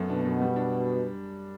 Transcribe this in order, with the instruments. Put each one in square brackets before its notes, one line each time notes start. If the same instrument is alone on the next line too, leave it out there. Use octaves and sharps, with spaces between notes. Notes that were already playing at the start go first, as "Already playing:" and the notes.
Already playing: [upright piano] F#2 A3 B3
[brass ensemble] B2 [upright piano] D4
[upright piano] F#2
G3
D4